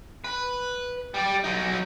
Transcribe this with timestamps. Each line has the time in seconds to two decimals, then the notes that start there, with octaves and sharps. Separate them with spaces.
0.24 B4
1.14 G3 D5
1.44 F#3 D#4